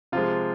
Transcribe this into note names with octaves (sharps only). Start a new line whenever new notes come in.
C3 F3 G#3 F4